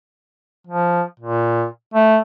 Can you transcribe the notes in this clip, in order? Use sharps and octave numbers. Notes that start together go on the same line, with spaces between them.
F3
A#2
A3